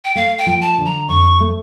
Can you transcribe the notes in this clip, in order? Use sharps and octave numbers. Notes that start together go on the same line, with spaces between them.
G5
A3 F5
G5
F3
A5
D3
A#5
F2 C#6
A3